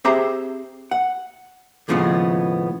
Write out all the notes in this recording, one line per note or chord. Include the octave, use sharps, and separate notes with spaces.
C4 G4 G#4 C5 E5 A#5
F#5
D#2 A2 C#3 F3 G#3 B3